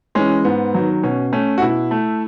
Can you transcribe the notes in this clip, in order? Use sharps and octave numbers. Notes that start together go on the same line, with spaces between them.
E3 G#3 C#4
G#2 B3
D#3 F#3
B2 C#4
A3 C#4
F#4
B2 E4
A3